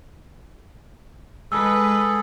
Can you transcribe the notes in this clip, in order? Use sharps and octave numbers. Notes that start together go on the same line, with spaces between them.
G#3 G#4 A4 B4 E6